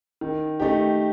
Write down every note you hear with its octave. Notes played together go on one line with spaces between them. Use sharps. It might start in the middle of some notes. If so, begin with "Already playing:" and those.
D#3
A3 D#4 G4